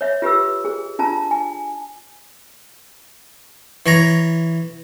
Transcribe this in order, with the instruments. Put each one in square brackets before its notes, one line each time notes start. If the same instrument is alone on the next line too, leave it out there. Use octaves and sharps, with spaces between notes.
[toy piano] C#5 E5
F4 G4 B4 E6
G#4
D4 F4 A5 A#5
G#5
[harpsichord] E3 C#5 A#5